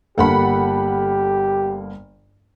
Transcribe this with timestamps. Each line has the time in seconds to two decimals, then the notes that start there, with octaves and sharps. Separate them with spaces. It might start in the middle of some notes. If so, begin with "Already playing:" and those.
0.18 G1 A#3 G4 A4 F#5 B5